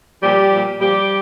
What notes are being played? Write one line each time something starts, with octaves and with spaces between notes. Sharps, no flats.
A#2 F3 G3 G4
F3
A#2
A#2 F3 G3 G4